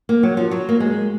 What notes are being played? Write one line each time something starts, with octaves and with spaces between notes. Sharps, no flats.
A#3
F#3
F3
F#3
A#3
G#3